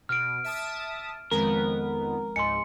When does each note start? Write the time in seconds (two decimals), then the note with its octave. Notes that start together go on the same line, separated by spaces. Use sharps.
0.09 B2 F6 D7
0.44 E5 A5 D#6
1.31 F2 D#3 F3 G#3 B3 C4 A#4
2.36 C#2 G#2 D#5 G#5 C6 C#7